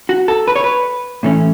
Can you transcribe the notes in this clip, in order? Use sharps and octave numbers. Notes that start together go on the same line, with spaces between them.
F#4
A4
B4
C#5
B4
A2 E3 A3 C#4